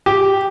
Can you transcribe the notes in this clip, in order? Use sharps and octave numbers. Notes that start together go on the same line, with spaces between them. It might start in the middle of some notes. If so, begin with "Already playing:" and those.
G4